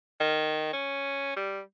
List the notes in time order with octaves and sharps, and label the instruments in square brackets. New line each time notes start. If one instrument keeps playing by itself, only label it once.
[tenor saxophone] D#3
C#4
G3